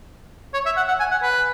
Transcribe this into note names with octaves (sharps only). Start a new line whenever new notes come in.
C#5
E5
F#5
F#5
G#5
F#5
B4